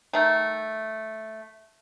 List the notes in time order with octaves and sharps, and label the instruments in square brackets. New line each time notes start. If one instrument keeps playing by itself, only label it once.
[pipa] D#3 A3